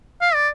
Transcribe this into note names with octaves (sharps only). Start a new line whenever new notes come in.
F5
D5